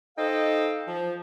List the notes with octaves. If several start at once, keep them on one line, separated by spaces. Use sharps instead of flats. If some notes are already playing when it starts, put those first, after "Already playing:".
D#4 A4 C5 D#5 F5 G5
F3